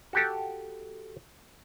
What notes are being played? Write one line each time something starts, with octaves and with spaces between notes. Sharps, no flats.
F#4 G4 A4